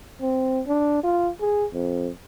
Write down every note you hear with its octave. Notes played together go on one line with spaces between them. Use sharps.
C4
D4
F4
G#4
F2